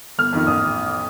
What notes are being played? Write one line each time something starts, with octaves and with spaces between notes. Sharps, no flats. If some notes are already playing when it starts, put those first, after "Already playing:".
G1 F6
F2 D#3
A1 D#6